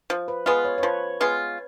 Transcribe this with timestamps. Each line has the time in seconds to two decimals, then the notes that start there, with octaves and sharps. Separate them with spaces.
0.10 F3
0.28 B4
0.46 G#3 B3 F4 B4
0.64 C#5
0.78 C#5
0.83 F3 B4
1.21 G#3 B3 F4